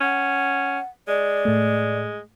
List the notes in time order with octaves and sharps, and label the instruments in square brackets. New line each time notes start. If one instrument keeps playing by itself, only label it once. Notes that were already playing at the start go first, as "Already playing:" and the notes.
[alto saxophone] C#4 [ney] F#5
[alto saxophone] G#3 [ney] D5
[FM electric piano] A2 A3